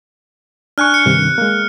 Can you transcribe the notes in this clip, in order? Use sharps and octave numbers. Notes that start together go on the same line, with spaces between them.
D4 G#5 C#6 F6 F#6
C#7
G2 C3 D#3
G#3 A#3